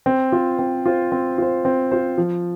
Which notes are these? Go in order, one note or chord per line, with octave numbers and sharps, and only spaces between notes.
C4
F4 C5
C4
F4 C5
C4
F4 C5
C4
F4 C5
F3